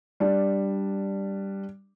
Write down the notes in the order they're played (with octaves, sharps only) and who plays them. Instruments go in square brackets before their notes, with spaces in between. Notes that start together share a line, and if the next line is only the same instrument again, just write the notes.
[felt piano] G3 D4